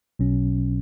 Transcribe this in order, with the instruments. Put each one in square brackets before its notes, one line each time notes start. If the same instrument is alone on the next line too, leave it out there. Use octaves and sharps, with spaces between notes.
[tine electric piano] B1 B2 F#3 C#4